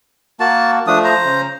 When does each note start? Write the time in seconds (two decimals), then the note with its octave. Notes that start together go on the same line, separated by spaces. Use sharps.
0.40 A#3 F#4 A5
0.87 F3 A3 D4 D#6
1.04 C5 A#5
1.25 C#3